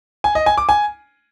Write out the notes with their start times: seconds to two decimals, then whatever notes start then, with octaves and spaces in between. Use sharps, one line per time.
0.24 G#5
0.35 D#5
0.46 G#5
0.57 D6
0.69 G#5